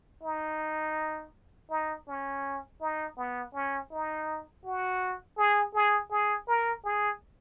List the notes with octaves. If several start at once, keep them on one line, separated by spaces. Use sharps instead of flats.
D#4
D#4
C#4
D#4
B3
C#4
D#4
F#4
G#4
G#4
G#4
A#4
G#4